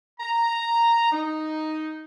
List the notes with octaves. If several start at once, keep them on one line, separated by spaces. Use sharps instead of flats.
A#5
D#4